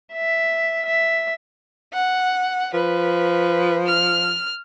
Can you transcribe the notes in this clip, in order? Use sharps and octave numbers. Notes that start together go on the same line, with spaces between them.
E5
E5
F#5
F3 B4
F6